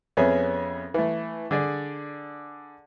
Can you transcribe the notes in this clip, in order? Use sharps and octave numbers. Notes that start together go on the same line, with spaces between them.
F2 B3 C#4 G#4 E5
E3 A3
D3 G#4 D5